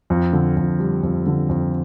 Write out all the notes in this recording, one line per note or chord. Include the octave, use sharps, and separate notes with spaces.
F2
D3
F2
G3
F2
D3
F2